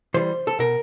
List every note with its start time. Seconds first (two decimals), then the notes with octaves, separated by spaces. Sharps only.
0.14 E3 G3 C5
0.47 A4
0.59 B2 A#4